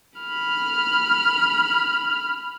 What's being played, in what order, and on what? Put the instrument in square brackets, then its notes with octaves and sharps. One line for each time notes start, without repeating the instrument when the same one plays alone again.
[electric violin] B5 F6